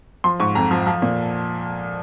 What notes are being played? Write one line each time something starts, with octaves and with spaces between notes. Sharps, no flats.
F3 C6
G#2 C#6
F2 A#5
F3
F3
A#2